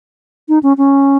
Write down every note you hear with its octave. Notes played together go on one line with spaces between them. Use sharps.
D#4
C#4
C#4